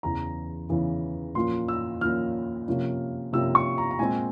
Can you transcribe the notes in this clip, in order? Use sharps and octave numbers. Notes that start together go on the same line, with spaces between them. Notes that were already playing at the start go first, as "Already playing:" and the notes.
E2 C#3 E3 A#5
E2 C#3 E3
A#2 F3 A#3 C#4 C6
E6
A#2 F3 A#3 C#4 F6
C3 F3 A#3 C#4
C3 F3 A#3 C#4 E6
C#6
A#5
A#5
A#2 G#3 C4 G#5